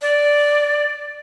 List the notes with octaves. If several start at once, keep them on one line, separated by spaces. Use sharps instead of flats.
D5